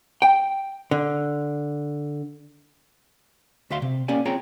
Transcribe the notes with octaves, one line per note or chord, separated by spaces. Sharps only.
G5
D3
D2 F#4 E5 F5 C6
C3
A#3 C#4 G4 D5 G#5
C4 F4 G#4 C#5 G5 A#5